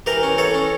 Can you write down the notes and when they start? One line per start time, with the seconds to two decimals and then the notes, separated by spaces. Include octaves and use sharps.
0.06 E3 G4 A#4
0.23 C#4
0.38 E3 A4 C#5
0.54 C#4